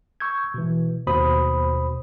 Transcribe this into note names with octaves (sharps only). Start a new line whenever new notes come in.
C#6 E6 G6 G#6
B2 E3
D#2 B2 C5 B5 D#6